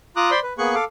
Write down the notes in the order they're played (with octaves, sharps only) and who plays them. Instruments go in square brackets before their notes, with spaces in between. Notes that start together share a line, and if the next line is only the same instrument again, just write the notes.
[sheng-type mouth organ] F4 A#5 D6 D#6 F#6
C5 D5 B5 C6
B4
A#3 B3 G#4 C#6 F#6
A4 F5 D6